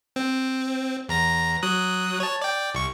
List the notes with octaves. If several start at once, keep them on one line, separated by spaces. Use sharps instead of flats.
C4
E2 A#5 A#6
F#3 D#6 F#6
C#5 A5
D5 G5
C2 C#6